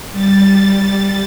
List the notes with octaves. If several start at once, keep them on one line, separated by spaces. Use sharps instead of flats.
G3 A6